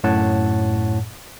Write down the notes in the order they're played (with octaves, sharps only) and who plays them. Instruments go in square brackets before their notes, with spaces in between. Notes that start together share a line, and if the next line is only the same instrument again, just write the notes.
[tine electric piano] F#2 A2 C#5 F#5 A5